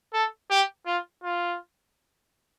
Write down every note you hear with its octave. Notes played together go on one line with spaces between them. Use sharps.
A4
G4
F4
F4